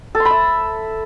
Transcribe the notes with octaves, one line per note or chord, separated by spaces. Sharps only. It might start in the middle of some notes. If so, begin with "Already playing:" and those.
A4
C6
B5
E5